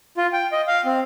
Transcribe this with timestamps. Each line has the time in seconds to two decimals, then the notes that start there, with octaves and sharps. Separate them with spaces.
0.17 F4
0.33 G5
0.52 D#5
0.67 F5
0.85 C4